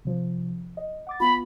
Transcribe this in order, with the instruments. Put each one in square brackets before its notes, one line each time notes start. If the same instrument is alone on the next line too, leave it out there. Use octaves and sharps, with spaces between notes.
[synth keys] C3 F3
D#5
F#5 D6 A6
[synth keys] B3 F4 [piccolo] B5